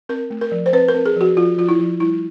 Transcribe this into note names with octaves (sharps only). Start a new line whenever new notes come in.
C4 A#4
A3
A#4
F3
C5
C4 B4
A#4
C4
G#4
F3 F#4
F3 F4
F3 F4
E4
F3
G3 E4